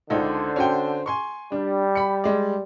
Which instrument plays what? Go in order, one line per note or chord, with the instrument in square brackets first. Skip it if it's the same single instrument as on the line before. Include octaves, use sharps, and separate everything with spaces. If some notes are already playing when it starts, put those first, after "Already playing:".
[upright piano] C#2 D#4 A4 [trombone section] D3 C5
[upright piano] C#4 F#4 G5
G#5 C6 C#6
[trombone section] G3 [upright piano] D4
[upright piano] B5 C#7
G#3 D5